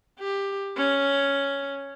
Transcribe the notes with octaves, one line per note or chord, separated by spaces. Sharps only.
G4
C#4